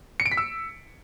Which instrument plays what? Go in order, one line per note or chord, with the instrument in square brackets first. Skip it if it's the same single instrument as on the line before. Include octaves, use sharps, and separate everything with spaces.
[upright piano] C#7
D7
B6
E6